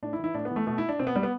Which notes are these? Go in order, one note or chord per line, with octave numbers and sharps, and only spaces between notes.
A2 D4
E4
E3
E4
A2 D4
B3
E3
A3
B2 A3
E4
D4
B2 C4
B3
G3
B3